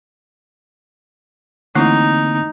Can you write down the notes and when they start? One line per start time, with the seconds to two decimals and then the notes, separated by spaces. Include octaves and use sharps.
1.75 D3 E3 A3 A#3 C4 D#4 E4